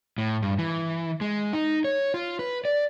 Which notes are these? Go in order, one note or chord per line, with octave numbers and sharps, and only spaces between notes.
A2
G2
E3
G#3
D#4
C#5
F4
B4
D5